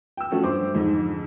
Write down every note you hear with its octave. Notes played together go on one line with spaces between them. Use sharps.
G5 E6
F3 A3 C#4 F#4
G2 C5 D6
F2 G#2 D3